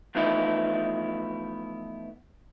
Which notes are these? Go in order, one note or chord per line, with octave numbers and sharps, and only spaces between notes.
E3 F3 A3 B3 D#4 E4